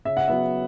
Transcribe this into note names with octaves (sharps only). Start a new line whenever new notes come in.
C#3 E5
F#5
F#3 B3 E5